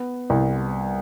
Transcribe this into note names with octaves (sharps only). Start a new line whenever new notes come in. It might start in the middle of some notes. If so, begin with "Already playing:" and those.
Already playing: B3
C2